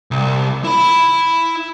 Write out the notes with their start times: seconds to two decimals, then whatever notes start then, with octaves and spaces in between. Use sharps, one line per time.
0.11 C2
0.64 E4 B5